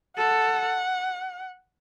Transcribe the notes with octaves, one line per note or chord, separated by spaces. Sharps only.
A4 F#5